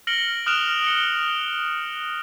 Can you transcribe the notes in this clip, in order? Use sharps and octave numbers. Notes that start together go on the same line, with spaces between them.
F6 A#6 C#7 D7 F#7 G7
D#6 F6 F#6 D7 E7 F7
C#7 G7